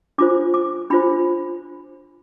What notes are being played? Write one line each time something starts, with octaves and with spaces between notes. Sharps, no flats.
D4 F4 C5 D6
D6
D4 F4 C5 B5